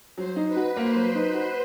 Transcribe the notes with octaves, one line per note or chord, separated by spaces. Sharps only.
F#3 C5
D#4
B4
F#4
A#3 C5
F#3
B4
D#4
F#4